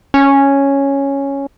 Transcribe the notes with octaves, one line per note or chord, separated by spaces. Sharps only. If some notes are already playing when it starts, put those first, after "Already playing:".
C#4